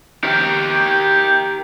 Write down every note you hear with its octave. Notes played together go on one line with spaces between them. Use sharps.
G4 A#4